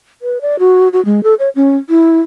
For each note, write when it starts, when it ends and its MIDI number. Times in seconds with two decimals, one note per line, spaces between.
0.22 0.41 71
0.41 0.56 74
0.59 0.88 66
0.93 1.03 66
1.05 1.23 56
1.23 1.34 69
1.39 1.49 73
1.55 1.77 61
1.89 2.20 64